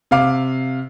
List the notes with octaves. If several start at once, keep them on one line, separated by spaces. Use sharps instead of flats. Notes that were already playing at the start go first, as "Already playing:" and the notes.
C3 F5 D6